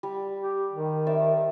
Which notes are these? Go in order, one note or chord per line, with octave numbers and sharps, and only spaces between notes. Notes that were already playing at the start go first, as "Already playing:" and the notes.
G3
G4
D#3
C5 D5 E5